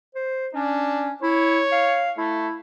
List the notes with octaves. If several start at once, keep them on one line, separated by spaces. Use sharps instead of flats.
C5
C#4 D4
E4 C#5
F5
A3 E4